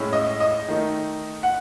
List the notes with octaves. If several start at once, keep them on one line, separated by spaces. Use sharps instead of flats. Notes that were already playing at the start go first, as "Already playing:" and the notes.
Already playing: A2 G#3 C#4 E4
D#5
D#5
D#3 A3 D#4
F#5